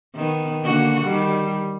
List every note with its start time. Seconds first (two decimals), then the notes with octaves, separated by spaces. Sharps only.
0.15 D#3 B3
0.63 D3 A#3 F#4
1.04 D#3 G3